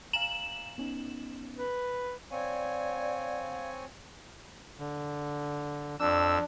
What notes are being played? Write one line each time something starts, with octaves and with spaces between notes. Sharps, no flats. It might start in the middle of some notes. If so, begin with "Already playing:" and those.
F5 G#5 A#5 E7 F#7
B3 C#4 D#4
B4
C4 C#5 D5 F5 G#5
D3
F2 D4 E6